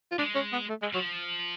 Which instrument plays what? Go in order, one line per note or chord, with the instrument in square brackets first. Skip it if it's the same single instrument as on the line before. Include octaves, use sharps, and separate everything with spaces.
[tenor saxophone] F4
[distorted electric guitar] G#3 [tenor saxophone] D4
[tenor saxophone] C#4
B3
A3
G#3
[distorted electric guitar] F3 [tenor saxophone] F#3